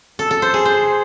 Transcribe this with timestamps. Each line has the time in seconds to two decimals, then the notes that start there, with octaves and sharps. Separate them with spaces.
0.19 A4
0.31 A4
0.42 C5
0.54 G#4
0.65 C5